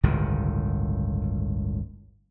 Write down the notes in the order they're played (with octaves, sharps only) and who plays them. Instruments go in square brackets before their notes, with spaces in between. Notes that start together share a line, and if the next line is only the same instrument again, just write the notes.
[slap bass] G1 C#2 A2 D#3